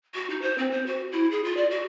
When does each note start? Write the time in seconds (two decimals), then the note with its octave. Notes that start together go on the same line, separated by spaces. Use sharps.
0.15 F#4
0.30 D#4
0.42 C5
0.58 C4
0.71 C5
0.87 F#4
1.12 E4
1.31 G#4
1.44 F4
1.57 D5
1.71 F#4